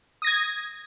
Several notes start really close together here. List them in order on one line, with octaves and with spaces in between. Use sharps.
D#6 A#6 G#6